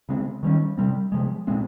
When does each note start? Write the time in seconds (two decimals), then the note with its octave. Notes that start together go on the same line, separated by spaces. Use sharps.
0.09 C#3 G#3 C4
0.43 D#3 G3 A#3 C#4
0.78 C3 G3 C4
1.12 C3 F3 G#3
1.47 A#2 G#3 C4